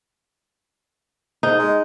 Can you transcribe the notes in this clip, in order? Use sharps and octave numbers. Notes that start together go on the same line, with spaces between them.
G#2 D#4
G#3